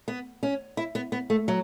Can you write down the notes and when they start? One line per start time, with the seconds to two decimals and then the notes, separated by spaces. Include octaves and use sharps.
0.08 B3
0.43 C#4
0.77 E4
0.95 B3
1.12 B3
1.30 A3
1.48 F#3